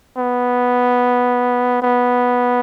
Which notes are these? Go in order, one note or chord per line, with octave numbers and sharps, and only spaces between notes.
B3
B3